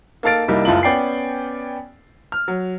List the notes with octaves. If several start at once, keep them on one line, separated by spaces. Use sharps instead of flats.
A#3 D#4 A4 F5 A6 D7
C2 G3 A#3 D#4 E4
F#1 C#2 E4 F4 A5 F#7
B3 C#4 D5 G5 G#5 C7
F6
F#3